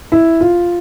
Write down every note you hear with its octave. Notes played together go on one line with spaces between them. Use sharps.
E4
F4